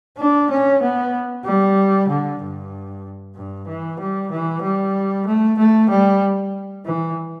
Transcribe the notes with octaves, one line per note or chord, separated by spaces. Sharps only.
D4
C#4
B3
G3
D3
G2
G2
E3
G3
E3
G3
A3
A3
G3
E3